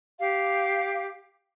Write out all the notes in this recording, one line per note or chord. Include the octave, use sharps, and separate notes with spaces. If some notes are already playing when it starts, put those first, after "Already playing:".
G4 F5